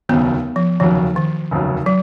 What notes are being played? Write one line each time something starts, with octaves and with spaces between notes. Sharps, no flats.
F1 D#2 C#3 F#3 B3
F3
F1 D#2 C#3 F3 F#3
D#3
F1 D#2 C#3 F#3
F#3